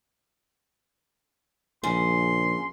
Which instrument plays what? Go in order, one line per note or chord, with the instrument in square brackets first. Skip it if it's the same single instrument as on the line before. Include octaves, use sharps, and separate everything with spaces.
[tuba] A#1 [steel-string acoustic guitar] C#3 [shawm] C6